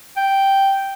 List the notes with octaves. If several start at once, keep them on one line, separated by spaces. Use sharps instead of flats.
G5